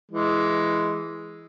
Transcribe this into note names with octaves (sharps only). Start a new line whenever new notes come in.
E3 G#3